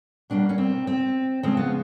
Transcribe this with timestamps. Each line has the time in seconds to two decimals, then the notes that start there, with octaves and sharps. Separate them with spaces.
0.30 B2 G3 A#3 D4
0.49 C#4
0.58 C4
0.87 C4
1.43 C#3 F3 G#3 C4
1.57 B3